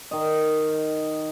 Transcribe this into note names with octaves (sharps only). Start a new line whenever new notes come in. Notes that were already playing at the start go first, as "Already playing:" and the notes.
D#3 D#5